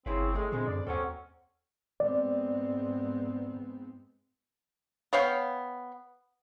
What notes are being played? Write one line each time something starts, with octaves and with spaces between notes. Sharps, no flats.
G1 C#3 C4 E4 G#4 B4
A2 G#3 A3 G#4
A#2 D3 G#3 C4 G#4
F#2 D5
D#2 F#3 C4 C#4 A4 C#5 F#5
G#2 B3 C4 D5
B3 C#5 F5 G5